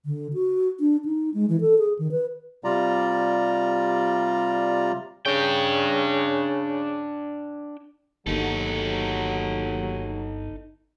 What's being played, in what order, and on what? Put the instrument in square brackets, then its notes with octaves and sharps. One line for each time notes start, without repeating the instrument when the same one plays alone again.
[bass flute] D3
F#4
D4
D#4
G#3
E3
A4
G#4
D#3
B4
[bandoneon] C3 G3 F4 D5 A#5
[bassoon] C#3 [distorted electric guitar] D4 G5
[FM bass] G1 [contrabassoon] D#2 [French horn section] F#3 [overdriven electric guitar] D#4 A4